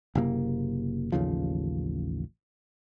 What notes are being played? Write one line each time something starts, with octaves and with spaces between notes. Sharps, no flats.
F#1 C3 A#3
A1 D#2 C#3 F3